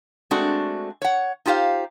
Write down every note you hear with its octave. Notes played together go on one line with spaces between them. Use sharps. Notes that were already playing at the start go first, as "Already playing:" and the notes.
G#3 A3 C4 D4 F#4
C#5 F#5
D#4 F4 G4 C5 F5